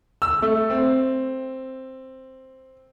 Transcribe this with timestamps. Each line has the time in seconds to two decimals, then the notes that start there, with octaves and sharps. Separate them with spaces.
0.22 E6
0.42 A3
0.70 C4